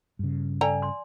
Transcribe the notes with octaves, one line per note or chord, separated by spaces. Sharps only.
G2 C#3
A4 D5 G5 G#5 A#5
C6